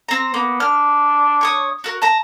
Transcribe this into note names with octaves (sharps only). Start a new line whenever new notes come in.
C4 A#5
A#3 B3
D4 F6
C#5 C#6 D#6
F#4 A#4
A5 A#5